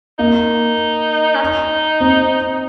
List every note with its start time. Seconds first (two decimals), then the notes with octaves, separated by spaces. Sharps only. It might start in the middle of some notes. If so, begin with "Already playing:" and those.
0.19 A#3 D#4
1.35 C#4
1.40 D#4
2.00 C4